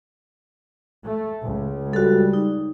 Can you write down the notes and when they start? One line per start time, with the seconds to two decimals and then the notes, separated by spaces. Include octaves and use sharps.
1.04 A3
1.43 C#2
1.93 G3 F#4 A4
2.33 D#4